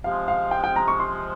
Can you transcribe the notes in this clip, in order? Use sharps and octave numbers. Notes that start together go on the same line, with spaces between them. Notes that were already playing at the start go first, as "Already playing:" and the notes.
C3 F3 G#3 F5
F5
G5
G5
A#5
C#6
C6